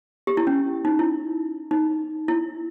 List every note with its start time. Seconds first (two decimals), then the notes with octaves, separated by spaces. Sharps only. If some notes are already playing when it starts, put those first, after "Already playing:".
0.27 G4
0.37 E4
0.47 C#4
0.85 D#4
0.99 E4
1.71 D#4
2.28 E4